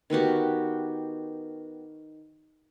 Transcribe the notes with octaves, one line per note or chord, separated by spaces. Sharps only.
D#3 B3 F#4 G4